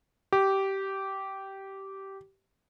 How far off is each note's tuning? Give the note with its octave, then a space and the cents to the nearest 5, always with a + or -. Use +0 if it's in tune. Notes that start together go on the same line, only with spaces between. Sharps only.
G4 -15